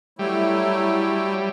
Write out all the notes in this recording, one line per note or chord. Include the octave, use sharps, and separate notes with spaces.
F#3 G3 A3 E4